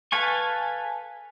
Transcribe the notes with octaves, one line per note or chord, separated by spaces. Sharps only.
A4 B4 F5 G#5 C#6